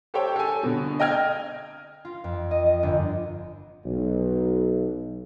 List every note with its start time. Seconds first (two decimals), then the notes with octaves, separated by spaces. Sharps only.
0.14 G4 A4 C5 C#5 G5
0.36 A4 G#5
0.63 B2 D3
1.00 D#5 G5 F6 G#6
2.05 F4
2.24 F2
2.51 D#5
2.66 D#5
2.83 G1
3.84 B1